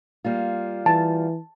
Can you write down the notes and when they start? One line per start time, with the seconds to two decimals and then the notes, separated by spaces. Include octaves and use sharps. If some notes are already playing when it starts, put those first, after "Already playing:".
0.24 G3 A#3 F4
0.86 E3 A5